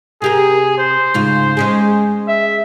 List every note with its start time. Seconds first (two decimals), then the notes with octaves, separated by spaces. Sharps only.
0.22 C3 G4 G#4 A#4
0.78 C5
1.14 G#2 C#3 F4
1.57 G#3 C#4 G#4
2.28 E5